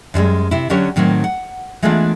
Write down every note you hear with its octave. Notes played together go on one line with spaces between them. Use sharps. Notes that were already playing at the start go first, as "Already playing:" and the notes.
F#2 F3 G3 G#3
C3 E4
D3 F#3 C#4 G4 C#5
A2 D#3 F#3 C4 F#4
F#5
E3 G#3 A3 B3 D4 F4